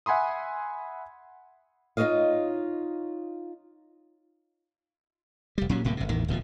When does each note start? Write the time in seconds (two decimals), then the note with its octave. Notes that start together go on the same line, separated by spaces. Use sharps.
0.06 E5 F#5 G#5 B5 C6 D#6
1.97 D#4 F4 A4 C#5 D#5 F5
5.58 F1 G3
5.69 A#2 F#3 C#4
5.85 D1 A2 C3 A#3
5.97 G1 C3
6.09 A1 E2 D#3
6.28 D1 B2 D#3 F3